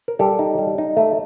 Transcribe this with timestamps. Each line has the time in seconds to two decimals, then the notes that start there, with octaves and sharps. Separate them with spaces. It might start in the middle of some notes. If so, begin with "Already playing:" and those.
0.08 A#4
0.19 G3 G4 A4
0.39 D#4
0.58 G3
0.78 D#4
0.97 A3